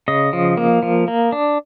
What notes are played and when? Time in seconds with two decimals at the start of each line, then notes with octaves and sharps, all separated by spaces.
0.08 C#3 D#5
0.33 F3
0.57 A#3
0.83 F3
1.08 A#3
1.32 D4